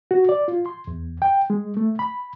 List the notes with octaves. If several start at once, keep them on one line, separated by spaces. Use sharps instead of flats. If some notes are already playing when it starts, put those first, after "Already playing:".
F#4
D5
F4
C6
E2
G5
G#3
A3
B5